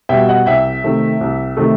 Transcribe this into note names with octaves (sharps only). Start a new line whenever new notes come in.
B2 G3 E5 G5
D#5 F#5
C2 E5 G5
C3 D#3 A3
C2
C3 D#3 A3